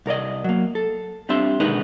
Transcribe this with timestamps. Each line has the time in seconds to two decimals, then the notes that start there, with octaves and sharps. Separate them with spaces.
0.06 C2 A#4 D5 D#5
0.44 F#3 A#3
0.75 A4
1.29 G3 C4 D4 F4 E5 C6
1.60 B2 D3 D#3 G#3 D#4 B4